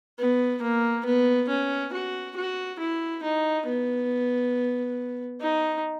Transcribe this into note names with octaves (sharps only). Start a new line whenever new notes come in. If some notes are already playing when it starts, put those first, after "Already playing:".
B3
A#3
B3
C#4
F#4
F#4
E4
D#4
B3
D#4